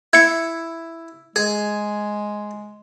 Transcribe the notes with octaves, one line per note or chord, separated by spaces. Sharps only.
E4 G#6 C#7
G#3 G#4